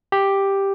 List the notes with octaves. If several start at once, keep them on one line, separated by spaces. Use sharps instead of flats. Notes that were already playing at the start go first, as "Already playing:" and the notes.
G4